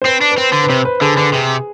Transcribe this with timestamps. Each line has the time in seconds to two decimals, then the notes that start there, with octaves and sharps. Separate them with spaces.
0.02 C5
0.05 C4 B4
0.21 D4
0.31 B4
0.37 C4 C5
0.53 D3
0.64 B4
0.70 C3 C5
0.85 B4
1.01 D3 G#4
1.17 D3 B4
1.33 C3 G#4